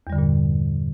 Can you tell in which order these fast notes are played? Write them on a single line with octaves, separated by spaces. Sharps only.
E2 G3 D3 G2 A#2